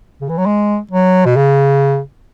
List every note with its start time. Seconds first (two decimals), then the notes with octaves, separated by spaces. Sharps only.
0.21 C#3
0.29 E3
0.38 F#3
0.46 G#3
0.91 F#3
1.25 B2
1.37 C#3